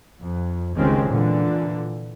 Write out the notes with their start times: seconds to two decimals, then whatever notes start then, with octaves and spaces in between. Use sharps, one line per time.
0.20 F2
0.76 F1 C#2 D#3 G#3 C4 C#4
1.08 A#2 D3 E3